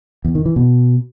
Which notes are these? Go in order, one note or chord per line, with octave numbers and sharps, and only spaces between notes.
E2
D#3
E3
B2